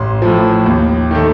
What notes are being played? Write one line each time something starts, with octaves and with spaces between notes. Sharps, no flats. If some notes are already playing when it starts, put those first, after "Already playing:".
Already playing: A1 C6
A2 F3
D#2
D#3 A3